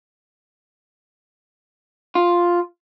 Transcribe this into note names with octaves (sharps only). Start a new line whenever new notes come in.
F4